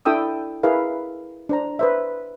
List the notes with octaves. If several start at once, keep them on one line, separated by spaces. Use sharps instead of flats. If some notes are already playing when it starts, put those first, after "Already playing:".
D4 E4 A4 G5 D#6 E6
E4 G#4 A#4 B4 F5
D4 C5 A#5
B4 C5 E5